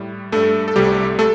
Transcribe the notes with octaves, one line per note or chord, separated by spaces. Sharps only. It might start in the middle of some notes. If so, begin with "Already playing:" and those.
Already playing: A2 G3
G2 G3 A3 A4
A4
C2 C3 G3 A3 G4
A3 A4